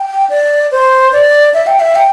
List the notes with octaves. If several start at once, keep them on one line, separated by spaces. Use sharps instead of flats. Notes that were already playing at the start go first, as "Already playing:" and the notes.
Already playing: G5
D5
C5
D5
E5
G5
E5
G5